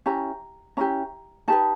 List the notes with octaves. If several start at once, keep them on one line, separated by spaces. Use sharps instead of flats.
C#4 E4 G4 A#5
C#4 E4 G4 A#5
D#4 G4 B4 A5